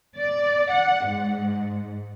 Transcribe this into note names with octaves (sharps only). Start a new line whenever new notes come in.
D5
F#5
G#2